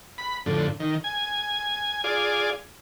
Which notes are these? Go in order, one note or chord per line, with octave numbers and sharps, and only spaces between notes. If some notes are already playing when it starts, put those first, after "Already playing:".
B5
F2 A2 D3
D#3
G#5
F4 G#4 D5